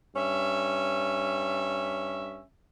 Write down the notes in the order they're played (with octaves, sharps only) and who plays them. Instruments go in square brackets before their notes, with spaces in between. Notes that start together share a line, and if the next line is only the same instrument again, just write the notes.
[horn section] G2 C#4 E5